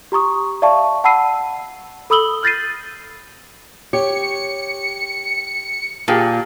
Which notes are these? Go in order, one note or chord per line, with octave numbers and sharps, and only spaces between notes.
G4 A#5 C#6 D#6
D5 E5 F5 A5 C#6
F#5 A5 B5 E6 C7 D#7
A4 B5 D#6 E6 F#7 G7
F6 G6 A6 A#6 C7 D#7
G4 C#5 C#7
A#2 G4 G#4 A5